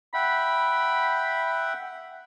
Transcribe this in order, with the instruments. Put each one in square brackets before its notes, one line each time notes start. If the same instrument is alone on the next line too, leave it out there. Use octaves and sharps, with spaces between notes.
[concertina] E5 F#5 G5 [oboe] B5